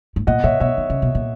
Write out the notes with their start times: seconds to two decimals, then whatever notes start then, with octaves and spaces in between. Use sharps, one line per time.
0.16 G#2
0.27 A#2 D#5 F#5
0.44 A#2 C#5 E5
0.60 B2 C#5 E5
0.77 D#3
0.90 C#3
1.02 B2
1.15 A#2